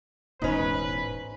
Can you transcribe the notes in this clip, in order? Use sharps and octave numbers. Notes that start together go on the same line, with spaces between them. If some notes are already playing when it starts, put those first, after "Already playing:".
E1 A1 E2 G#2 C#4 D#4 B4